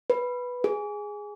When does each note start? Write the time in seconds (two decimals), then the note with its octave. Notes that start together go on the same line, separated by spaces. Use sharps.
0.10 B4
0.64 G#4